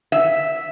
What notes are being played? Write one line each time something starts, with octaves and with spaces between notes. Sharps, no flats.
E5